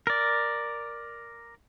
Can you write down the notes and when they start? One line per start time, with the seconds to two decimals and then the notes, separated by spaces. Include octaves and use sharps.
0.07 A#4 D5